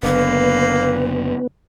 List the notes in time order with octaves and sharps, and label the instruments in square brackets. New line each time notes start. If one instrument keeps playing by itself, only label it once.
[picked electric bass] F#1 D3 [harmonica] A#3 [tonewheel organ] B3 [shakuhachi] B4